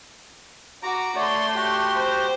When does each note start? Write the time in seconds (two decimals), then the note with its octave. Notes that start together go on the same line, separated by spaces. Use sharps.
0.83 F#4 A#5 D6
1.16 A3 C#5 D5 C6
1.55 F#4 G4
1.97 C5